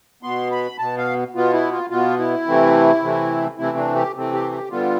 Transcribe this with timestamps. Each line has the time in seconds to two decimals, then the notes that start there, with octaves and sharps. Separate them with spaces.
0.23 B2 B3 C6
0.52 B5
0.79 B2 B3 A5
0.98 F5
1.34 B2 B3 F4
1.53 E4
1.72 F4
1.90 B2 B3 F4
2.19 E4
2.46 C3 E3 A3 C4
3.02 C3 E3 A3 C4
3.58 C3 E3 A3 C4 E4
3.77 D4
3.95 G4
4.15 C3 E3 A3 C4
4.32 G4
4.52 G4
4.70 D3 G3 B3 F4